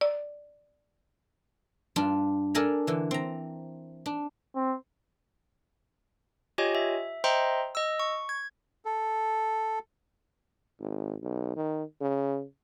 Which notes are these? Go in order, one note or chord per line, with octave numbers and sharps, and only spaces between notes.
D5
G2 D4 F4
D4 A4 A#4 G#5 A#5
D3 E3
C4 A#5
D4
C4
F4 G4 C#5 D#5 G#5
E5
C5 D#5 E5 G5 A#5 C6
D#5 E6
C#6
G#6
A4
G#1
B1
D#3
C#3